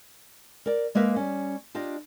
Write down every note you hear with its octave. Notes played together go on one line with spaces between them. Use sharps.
A#4 D5
G#3 A#3 A#4 B4 E5
G3 C#4
D4 F4 G4 D#5